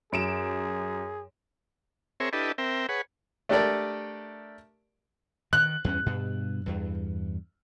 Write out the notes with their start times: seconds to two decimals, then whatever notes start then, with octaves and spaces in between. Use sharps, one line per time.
0.12 F#2 G#4 D7 E7
2.20 C4 G#4 A#4 C#5 E5
2.33 D4 E4 G4 A4 B4 D#5
2.58 C4 A#4 E5 G5
2.89 G#4 B4 C#5 F#5
3.49 A3 D4 G4 A4 A#4 D5
5.53 D#3 F#6
5.84 E2 G2 C#4
6.06 G2 B2
6.66 E2 G2